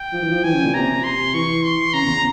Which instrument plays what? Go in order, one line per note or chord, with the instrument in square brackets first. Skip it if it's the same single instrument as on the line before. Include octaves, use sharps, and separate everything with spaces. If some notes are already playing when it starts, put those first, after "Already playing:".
Already playing: [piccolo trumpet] G5
[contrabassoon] F3
E3
F3
[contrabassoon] E3 [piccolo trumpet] G#5
[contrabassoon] C#3
A#2
[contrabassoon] C3 [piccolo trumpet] A#5
[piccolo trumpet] C6
[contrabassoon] E3 [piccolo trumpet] C#6
[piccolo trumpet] C6
[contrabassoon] C#3 [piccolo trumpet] A#5
[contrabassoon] E2